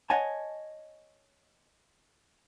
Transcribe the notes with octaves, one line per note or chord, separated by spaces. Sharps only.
C#5 D#5 F#5 G#5 A5